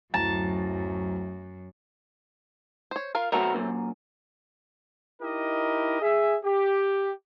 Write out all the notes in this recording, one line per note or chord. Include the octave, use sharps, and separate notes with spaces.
D1 F#2 A5 A#5
C5 C#5
F4 A#4 F5
B2 F#3 A3 C4 F#4 A#4
F#2 A#2
D#4 E4 G4 A#4 D#5
G#4 E5
G4